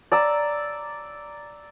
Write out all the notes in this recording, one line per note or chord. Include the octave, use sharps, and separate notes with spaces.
D5 A#5 E6